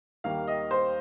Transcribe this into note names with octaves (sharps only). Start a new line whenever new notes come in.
D#2 D#3 G3 A#3 F5
D#5
C5